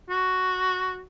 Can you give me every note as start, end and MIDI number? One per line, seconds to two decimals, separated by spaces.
0.10 1.02 66